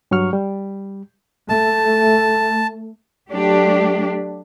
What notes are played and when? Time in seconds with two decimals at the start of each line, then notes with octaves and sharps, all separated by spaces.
0.11 G2 F#3 C#6 F6
0.33 G3
1.49 A3 A5
3.30 F#3 A3 D4 G4